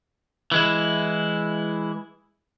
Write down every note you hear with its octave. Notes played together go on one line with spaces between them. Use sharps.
E3 G#3 E4